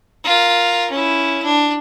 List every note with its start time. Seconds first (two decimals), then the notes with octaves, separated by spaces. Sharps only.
0.25 F4 A#4
0.91 C#4 E4
1.44 D4